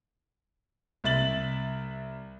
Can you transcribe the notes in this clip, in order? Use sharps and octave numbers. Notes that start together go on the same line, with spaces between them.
C2 E5 A6 F#7